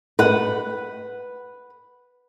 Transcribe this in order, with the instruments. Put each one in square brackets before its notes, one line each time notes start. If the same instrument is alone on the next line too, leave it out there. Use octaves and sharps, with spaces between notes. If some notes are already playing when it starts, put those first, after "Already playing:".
[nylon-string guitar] B4 F#5